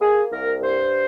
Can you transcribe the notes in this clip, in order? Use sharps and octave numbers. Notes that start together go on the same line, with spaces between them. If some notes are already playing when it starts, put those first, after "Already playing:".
A#3 G#4
C2 A#4
G2 C5